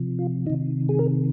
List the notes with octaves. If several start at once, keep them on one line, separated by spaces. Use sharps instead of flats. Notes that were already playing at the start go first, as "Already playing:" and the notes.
Already playing: C3 F3
F4
C3 D#3 D#4
G#4
A#4